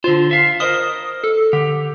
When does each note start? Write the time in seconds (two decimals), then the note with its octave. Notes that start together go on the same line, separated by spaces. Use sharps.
0.04 D3 F4 C5
0.31 E5 F5
0.60 A#4 C5 D#5 D#6
1.24 A4
1.53 D3 G4